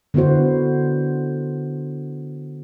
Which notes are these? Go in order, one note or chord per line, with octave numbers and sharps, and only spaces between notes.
D3 B3 E4 F#4 C5